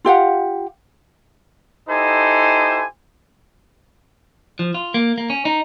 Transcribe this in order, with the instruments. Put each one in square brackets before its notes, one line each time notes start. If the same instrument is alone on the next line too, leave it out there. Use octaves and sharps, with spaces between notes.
[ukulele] F4 G4 F5 F#5
[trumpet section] D#4 E4 G4 A4 C5 G#5
[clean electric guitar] F3
F4
A#3
A#3
C#4
D#4